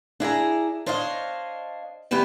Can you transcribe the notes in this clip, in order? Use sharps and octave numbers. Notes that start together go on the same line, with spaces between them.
D4 E4 G#4 A#5
D4 C5 C#5 D#5 F5
D#3 G3 B3 E4 G4 B4